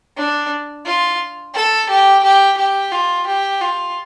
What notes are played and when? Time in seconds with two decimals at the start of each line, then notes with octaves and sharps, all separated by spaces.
0.17 D4
0.86 F4
1.55 A4
1.89 G4
2.23 G4
2.58 G4
2.92 F4
3.27 G4
3.61 F4